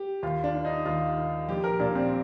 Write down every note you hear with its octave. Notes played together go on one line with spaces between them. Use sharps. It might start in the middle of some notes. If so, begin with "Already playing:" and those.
Already playing: G4
D#2 F4
D4
D#3
D#4
D#2 F4
D#3
A#1 G4
A#4
A#2 D4
C4